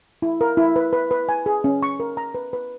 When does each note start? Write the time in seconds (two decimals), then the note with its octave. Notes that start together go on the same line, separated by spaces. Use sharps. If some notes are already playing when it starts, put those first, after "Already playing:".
0.22 E4
0.41 A#4
0.57 E4
0.76 B4
0.93 B4
1.11 B4
1.29 G#5
1.46 G#4
1.64 C#4
1.83 C#6
2.00 A#4
2.17 A#5
2.35 B4
2.53 B4